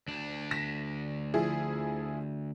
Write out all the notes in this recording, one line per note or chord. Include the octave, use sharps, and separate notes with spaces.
D2 D4
A#6 B6 E7
F3 E4 G#4